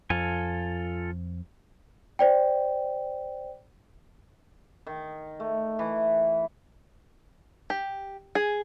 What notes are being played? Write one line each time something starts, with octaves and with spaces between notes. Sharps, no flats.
F2 F4 A4 G#5
C5 D5 G5
D#3
A3
E3
G4
G#4